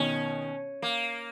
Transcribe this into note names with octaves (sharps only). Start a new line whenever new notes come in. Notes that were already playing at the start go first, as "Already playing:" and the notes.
Already playing: B2 D#3 C#4
A#3